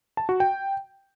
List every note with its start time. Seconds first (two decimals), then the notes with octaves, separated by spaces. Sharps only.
0.17 A5
0.29 F#4
0.40 G5